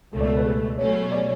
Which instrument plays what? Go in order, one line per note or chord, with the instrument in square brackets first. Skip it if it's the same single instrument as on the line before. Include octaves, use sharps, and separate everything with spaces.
[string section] C#2 B2 A3 [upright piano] A4
[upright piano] D5
A4
B4
G#4
[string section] B2 F#3 A3 C#4 [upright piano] C#5
[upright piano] D5